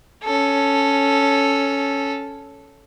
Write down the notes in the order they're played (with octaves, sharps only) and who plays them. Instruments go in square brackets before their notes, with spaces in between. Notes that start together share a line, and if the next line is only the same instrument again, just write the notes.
[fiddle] C#4 A4